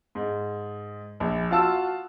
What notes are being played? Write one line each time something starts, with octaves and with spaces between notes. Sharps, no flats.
G#2
A#1
F4 F#4 A5 E6